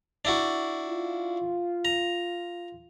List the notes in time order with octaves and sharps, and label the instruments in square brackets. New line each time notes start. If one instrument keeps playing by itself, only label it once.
[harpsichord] D4 E4 F#4
[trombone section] F4
[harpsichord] A#5